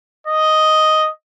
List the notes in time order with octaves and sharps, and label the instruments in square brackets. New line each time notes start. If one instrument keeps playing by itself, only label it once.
[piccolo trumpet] D#5